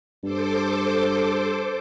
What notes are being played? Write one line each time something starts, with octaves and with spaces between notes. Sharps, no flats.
G2 A4 C5 D6